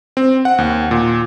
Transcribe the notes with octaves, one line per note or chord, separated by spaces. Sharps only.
C4
F#5
D#2
A#2